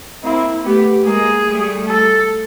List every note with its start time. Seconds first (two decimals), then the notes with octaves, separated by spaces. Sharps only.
0.23 A#3 C4 E4
0.64 A3 B3 G4
1.06 G#3 A#3 G#4
1.47 G3 A3
1.88 A4